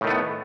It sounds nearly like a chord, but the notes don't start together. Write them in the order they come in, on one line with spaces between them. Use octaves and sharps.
A2 D#3 A3 B3